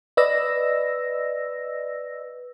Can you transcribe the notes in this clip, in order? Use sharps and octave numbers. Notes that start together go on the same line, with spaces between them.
B4 D5 D#5 E6 A#6